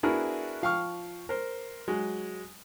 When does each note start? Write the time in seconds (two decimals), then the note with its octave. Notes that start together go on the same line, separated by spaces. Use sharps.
0.03 B3 D4 E4 F#4 G#4 A#4
0.62 F3 F5 G5 C#6 F6
1.29 A#4 C5
1.88 F#3 G#3